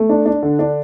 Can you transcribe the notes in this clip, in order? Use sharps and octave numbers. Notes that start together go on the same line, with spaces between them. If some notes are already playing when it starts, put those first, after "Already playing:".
Already playing: A3
D4
D4
D3
D4